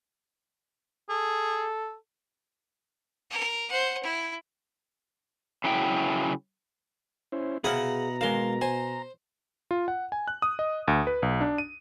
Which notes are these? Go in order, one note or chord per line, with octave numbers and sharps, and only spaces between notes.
G#4 A4
A#4
C5 F#5
E4
C#3 F#3 E4 E5 G5
C#4 E4 C5
B2 E4 G#4 C5 F5 F#5 A#5 D#6
G#3 A#4 C5 F5 C6
C5 G#5
F4
F#5
G#5
F#6
D#6
D#5
D2
B4
B1
D4
D#7